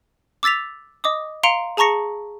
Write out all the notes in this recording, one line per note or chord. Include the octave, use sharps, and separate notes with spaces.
D6 E6 A6 B6 F7
D#5 D6 D#6
F5 A#5 C6 C#7 D7 F7
G#4 A5 A#5 C#6 A#6 C#7